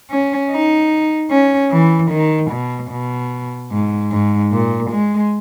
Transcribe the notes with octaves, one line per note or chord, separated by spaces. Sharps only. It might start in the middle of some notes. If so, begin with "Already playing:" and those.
C#4
D#4
C#4
E3
D#3
B2
B2
G#2
G#2
A#2
G#3